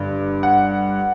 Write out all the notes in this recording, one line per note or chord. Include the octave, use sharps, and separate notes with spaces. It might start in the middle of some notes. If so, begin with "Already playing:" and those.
Already playing: G1 G2 D3
F#5